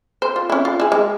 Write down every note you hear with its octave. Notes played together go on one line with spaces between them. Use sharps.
C5
F4
C#4 E4
F4
E4 G#4
G#3